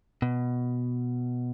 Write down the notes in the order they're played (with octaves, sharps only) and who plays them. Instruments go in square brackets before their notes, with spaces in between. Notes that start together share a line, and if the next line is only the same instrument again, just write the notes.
[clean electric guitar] B2